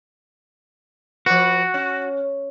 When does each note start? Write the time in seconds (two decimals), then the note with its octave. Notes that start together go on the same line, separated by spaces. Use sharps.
1.26 F3 F#4 B4
1.74 C#4